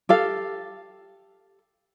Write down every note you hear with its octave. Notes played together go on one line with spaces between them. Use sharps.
G4 A4 F5